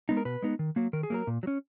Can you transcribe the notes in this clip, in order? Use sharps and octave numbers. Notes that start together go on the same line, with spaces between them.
G#3 B3 D#4
A#4
B2 B4
G#3 B3 D#4
D#3
F#3 A#3
D#3 A#4
G#4
F#3 A#3 A#4
A#2
F#3
C#4